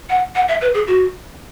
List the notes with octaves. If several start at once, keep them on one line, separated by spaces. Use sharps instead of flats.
F#5
F#5
E5
B4
G#4
F#4